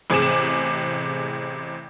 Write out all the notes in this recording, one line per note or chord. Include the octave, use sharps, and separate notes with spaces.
A1 C3 G#4 D6 E7